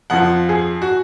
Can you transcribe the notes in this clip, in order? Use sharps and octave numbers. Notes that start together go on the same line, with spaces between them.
F2 F3 F#5
G#4
F#4